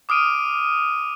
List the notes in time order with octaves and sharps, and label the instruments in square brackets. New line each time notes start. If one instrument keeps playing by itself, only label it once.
[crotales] D6 D#6 F6 D7 D#7